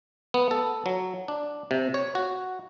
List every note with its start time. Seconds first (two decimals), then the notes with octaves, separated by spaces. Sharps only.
0.34 B3
0.51 A4
0.86 F#3
1.28 D4
1.71 C3
1.94 C#5
2.15 F#4